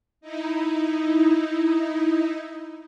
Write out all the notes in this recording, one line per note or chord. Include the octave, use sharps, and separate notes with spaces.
D#4 E4